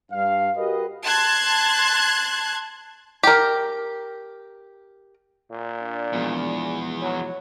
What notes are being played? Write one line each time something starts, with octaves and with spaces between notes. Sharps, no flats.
G2 F5
F#4 G4 A#4 B4 D#5
A5 C6 F#6 G#6
G4 A#4
A#2
D4
E2 B2 F3 G#3
F#3 C#5